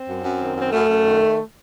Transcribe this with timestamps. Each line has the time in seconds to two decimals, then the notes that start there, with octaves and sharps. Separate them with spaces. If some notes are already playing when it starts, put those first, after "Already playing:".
Already playing: C4
0.08 F#2
0.24 F#2
0.41 D#3
0.57 F#2 C4
0.73 F#2 A3
0.89 F#2
1.06 D#3